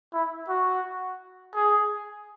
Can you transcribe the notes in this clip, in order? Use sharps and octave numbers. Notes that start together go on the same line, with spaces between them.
E4
F#4
G#4